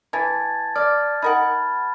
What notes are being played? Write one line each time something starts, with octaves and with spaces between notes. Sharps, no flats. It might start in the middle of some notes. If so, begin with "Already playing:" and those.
E3 A5 G#6 A6
D5 F6 A6
D#4 A#4 F#5 B5